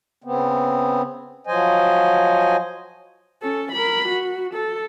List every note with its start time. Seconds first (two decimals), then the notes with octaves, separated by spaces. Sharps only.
0.24 C#3 B3 C4
1.47 F3 F#3 C5 D#5 G#5
3.42 C#4 A4
3.72 A#4 B5
4.08 F#4
4.54 A4